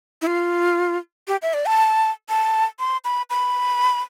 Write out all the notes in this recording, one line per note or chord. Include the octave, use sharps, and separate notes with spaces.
E4
F4
G4
E5
D5
A5
A5
C6
B5
B5